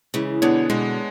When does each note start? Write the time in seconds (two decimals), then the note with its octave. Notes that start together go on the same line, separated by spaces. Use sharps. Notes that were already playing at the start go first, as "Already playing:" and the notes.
0.14 C#3 E3 G#3
0.42 B2 D3 B3 D4 G#4 C#5
0.70 B2 D3 G#3